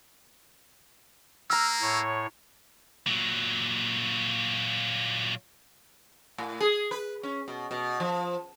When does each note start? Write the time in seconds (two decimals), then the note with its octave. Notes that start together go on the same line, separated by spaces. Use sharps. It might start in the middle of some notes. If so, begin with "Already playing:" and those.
1.50 A#3 A#5 E6 F6
1.82 A2 C#5
3.07 A#2 F#3
6.38 A2
6.60 G#4
6.91 B4
7.23 C#4
7.48 B2
7.71 B2
8.00 F3